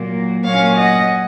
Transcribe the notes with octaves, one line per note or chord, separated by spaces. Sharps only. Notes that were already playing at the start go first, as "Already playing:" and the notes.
Already playing: A#2 F#3 A#3
A#2 F#3 C#4 C#5 F5
D#5 F#5